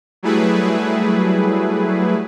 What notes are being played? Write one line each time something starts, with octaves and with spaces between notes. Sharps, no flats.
F#3 G3 A3 E4 G#4 B4